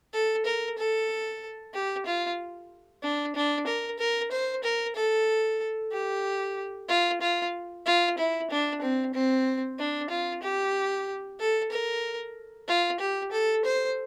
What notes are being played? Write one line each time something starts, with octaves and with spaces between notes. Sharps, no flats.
A4
A#4
A4
G4
F4
D4
D4
A#4
A#4
C5
A#4
A4
G4
F4
F4
F4
E4
D4
C4
C4
D4
F4
G4
A4
A#4
F4
G4
A4
C5